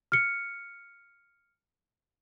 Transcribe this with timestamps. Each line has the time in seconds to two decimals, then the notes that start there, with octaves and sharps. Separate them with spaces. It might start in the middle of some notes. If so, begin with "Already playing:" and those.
0.12 F6 C#7